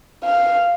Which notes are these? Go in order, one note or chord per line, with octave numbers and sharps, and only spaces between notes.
F5